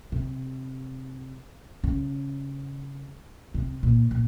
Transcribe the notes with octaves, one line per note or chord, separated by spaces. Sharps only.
C3
C#3
C3
A#2
A#2